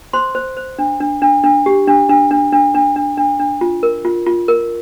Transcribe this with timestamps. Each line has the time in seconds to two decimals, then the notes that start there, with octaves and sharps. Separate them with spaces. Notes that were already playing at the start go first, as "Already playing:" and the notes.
0.13 C5 C6
0.35 C5
0.57 C5
0.79 D4
1.00 D4
1.22 D4
1.44 D4
1.66 G4
1.88 D4
2.09 D4
2.31 D4
2.53 D4
2.74 D4
2.96 D4
3.17 D4
3.40 D4
3.61 F4
3.83 A#4
4.05 F4
4.26 F4
4.48 A#4